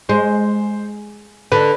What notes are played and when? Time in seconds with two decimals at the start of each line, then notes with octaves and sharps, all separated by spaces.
0.09 G#3 C5
1.52 D3 B4